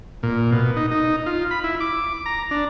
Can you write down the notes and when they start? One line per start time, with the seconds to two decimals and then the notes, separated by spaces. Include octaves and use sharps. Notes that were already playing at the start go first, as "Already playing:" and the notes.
0.23 A#2
0.52 B2
0.76 D#4
0.91 D#4
1.26 F4
1.51 B5
1.64 E4
1.80 D6
2.26 A#5
2.51 D4